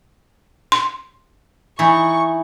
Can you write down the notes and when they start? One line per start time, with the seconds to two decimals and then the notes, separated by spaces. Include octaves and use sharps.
0.72 C6
1.79 E3 D#4 E4 C#6